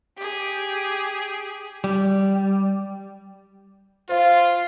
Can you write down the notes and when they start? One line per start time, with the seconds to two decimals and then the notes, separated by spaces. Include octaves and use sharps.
0.17 G4 G#4
1.84 G3
4.09 F4 C5 F5